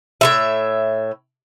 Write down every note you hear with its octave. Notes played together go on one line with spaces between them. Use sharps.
A2 F3 E5